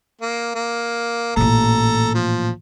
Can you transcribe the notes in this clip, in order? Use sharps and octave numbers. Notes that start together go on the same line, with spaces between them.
A#3
A#3
A1 A#2 A4 A#5
F3